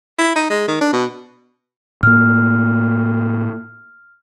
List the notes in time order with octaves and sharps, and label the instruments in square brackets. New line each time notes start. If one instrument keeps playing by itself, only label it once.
[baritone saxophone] E4
D#4
G#3
D#3
D4
B2
[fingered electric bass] A2 A#3 [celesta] F6